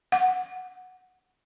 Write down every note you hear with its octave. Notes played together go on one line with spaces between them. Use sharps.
F#5